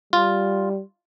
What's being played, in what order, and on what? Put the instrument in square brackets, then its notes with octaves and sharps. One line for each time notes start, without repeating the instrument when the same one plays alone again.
[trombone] G3 [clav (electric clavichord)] F4